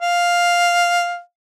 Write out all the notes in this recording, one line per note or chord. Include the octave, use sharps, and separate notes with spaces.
F5